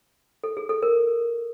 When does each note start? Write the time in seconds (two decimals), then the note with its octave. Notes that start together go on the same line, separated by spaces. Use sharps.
0.44 A4
0.57 G#4
0.69 A4
0.82 A#4